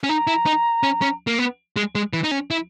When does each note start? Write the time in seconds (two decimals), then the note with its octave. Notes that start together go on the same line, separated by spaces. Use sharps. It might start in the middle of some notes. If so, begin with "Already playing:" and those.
0.03 C#4
0.09 D#4 A#5
0.27 E4
0.46 D#4
0.83 C#4
1.02 C#4
1.27 A#3
1.38 B3
1.76 G#3
1.95 G#3
2.13 E3
2.24 D#4
2.31 C#4
2.50 E4